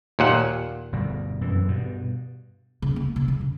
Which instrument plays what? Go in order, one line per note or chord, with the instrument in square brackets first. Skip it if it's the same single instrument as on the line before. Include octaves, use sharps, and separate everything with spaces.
[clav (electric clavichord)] D#2 A#2 F#5
[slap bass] G1 B2 G3
F#2 E3
G2 B2
[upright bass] C#3
A#3
C#3
D3
C#3